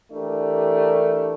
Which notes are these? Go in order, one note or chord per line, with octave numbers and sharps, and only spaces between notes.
E3 A3 D4 G4 A#4